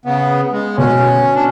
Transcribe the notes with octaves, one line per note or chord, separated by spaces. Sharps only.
C#3 B3
G#3
B2 C#4 F#4
D4